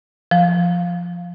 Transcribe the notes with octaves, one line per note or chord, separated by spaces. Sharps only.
F3